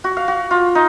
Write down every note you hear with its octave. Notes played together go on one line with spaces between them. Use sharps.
F#4
F5
F#4
F4
D#4